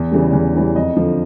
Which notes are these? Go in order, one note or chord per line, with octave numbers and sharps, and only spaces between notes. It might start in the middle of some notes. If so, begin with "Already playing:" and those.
Already playing: E2
C#3 E3 G3
E2
C#3 E3 G3
F2 D#5
D3 F3